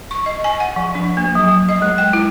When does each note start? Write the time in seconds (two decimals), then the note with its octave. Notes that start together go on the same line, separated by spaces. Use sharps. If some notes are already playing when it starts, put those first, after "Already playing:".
0.11 C#6
0.26 D#5
0.44 G#5
0.60 F#5
0.76 F3
0.95 D4
1.17 A#3
1.35 F#3
1.69 D#5
1.82 G#3
1.98 G5
2.13 E4